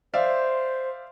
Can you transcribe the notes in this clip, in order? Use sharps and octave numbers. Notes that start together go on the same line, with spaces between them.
C5 D5 E5 F5